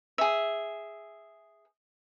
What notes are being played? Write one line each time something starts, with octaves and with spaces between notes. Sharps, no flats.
G#4 E5